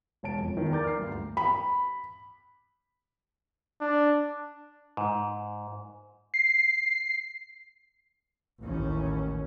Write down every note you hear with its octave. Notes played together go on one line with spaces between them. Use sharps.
E1 C#5 A5 D7
F2
E2 D#3 F3
A#4 D5 A#5 D6 G6 A6
F6 C7
D2 G2
B5
D4
G#2
C7
A1 D#2 C#4